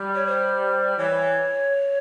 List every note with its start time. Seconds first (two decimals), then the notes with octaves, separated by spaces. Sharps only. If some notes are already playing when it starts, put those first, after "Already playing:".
Already playing: G3
0.15 C#5
0.26 C5
0.97 E3 C#5